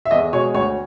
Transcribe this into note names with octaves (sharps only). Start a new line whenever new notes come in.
E5
E2 D#5
B2 G#3 C#5
D2 C#5